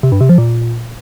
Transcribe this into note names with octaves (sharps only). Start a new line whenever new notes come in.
C3
G2
C3
F3
A#2